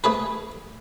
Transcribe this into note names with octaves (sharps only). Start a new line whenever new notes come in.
A3 G#4 B4